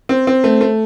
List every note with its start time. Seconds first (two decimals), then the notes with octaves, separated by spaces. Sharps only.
0.09 C4
0.27 C4
0.44 A3
0.61 A3